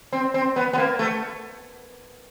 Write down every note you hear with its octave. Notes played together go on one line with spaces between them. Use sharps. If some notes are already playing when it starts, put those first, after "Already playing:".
C4
C4
B3
B3
A#3
A3